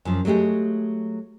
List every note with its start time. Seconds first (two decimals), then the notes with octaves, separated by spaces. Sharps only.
0.05 F#2 F3
0.25 F#3 G#3 A3 G4 G#4